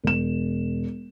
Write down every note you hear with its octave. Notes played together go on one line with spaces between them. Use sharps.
E1 E7